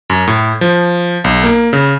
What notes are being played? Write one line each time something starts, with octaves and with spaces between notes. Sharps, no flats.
F#2
A2
F3
B1
A#3
C#3